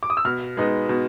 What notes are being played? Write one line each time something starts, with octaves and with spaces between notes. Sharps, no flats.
D6
D#6
E6
B2 F6
G#3 B3 D#4
B2